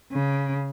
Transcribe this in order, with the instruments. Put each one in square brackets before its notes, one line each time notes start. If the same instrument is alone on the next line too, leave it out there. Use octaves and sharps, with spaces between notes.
[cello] C#3